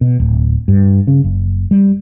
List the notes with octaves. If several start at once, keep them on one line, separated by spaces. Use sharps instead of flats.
B2
D1
G2
C#3
F#1
G3